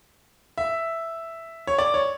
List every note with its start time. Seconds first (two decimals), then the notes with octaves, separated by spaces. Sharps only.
0.58 E5
1.67 C#5
1.78 D5
1.94 C#5